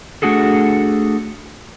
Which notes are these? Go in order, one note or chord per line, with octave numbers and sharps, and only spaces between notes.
A3 D4 F#4 G#4 A4